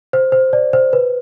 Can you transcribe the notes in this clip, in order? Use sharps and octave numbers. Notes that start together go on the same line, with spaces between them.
C5
C5
D5
C5
B4